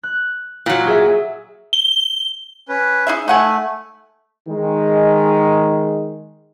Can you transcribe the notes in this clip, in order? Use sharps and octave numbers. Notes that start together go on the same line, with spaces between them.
F#6
A#2 F#3
G#4 E5
G7
C#4 B4
D#4 G#4 E5
A3 D#4 F#5 G#5
D#3 G#3